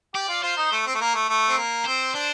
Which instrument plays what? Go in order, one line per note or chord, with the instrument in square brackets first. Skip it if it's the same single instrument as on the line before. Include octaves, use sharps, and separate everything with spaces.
[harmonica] G4 [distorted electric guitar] D5
[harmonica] F4
[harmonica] F4 [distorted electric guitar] C5
[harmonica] D#4
A3
C4
A3
A#3
A3
A3
C4
A#3
[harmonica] C4 [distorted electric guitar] C5
[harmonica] D4 [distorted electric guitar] C5